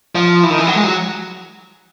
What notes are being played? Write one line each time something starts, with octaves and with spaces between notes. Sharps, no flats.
F3
E3
D#3
E3
F#3
G#3
F#3